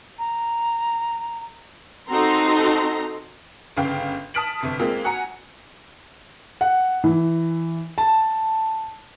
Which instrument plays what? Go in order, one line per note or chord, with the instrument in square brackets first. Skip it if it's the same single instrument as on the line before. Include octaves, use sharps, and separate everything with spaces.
[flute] A#5
[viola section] C4 D#4 F#4 A4 A#5 C6
[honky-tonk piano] G1 C#3 F5 G5
A5 D#6 F6 B6 D7 F#7
G1 C3 B6
G#3 A#3 C4 F4
F#4 F#5 G#5 A#5 C#7
[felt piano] F#5
E3
A5